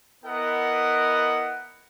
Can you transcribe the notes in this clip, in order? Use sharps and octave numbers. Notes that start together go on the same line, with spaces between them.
B3 E4 A#4 D#5 F#5